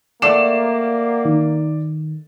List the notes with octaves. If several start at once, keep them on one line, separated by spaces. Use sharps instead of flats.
A3 A#3 D5 F#5 D6 C7 E7
D#3